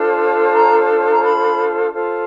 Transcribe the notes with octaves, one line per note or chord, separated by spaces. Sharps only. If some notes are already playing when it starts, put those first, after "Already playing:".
Already playing: D4 F4 A4 C5
A#5
A#5
B5
F4 A4 C5